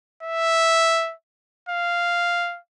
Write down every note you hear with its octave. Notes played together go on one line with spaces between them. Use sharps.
E5
F5